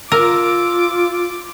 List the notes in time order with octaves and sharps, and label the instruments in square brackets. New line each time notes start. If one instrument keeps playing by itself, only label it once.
[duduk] F4 [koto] A#4 [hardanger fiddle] D6 [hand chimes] E6